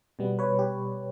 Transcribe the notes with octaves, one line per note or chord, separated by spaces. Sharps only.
B2 G3 B3
B4 C#5
G4